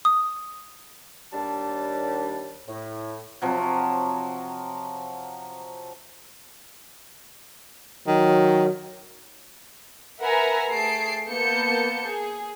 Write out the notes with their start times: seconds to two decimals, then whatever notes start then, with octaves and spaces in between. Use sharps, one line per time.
0.05 D#6
1.33 D#2 G3 D4 A5
2.68 A2
3.42 C3 F3 F#3
8.08 D#3 F#3
10.22 A#4 B4 E5 F#5 G#5 A#5
10.69 A3 G#4 A5 C7 D7
11.28 A#3 B3 A5 G6 C#7
12.07 G#4